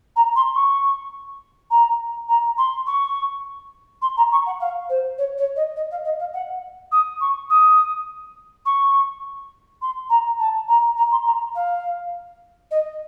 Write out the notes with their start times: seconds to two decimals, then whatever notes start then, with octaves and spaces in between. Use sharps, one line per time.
0.16 A#5
0.35 C6
0.55 C#6
1.70 A#5
2.28 A#5
2.58 C6
2.86 C#6
4.02 C6
4.17 A#5
4.31 C#6
4.46 F#5
4.60 F5
4.89 C5
5.18 C#5
5.38 C#5
5.56 D#5
5.76 D#5
5.91 F5
6.04 D#5
6.19 F5
6.33 F#5
6.91 D#6
7.20 C#6
7.50 D#6
8.65 C#6
9.81 C6
10.09 A#5
10.40 A5
10.68 A#5
10.97 A#5
11.11 C6
11.26 A#5
11.55 F5
12.71 D#5